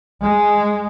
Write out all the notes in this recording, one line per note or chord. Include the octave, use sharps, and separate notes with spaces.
G#3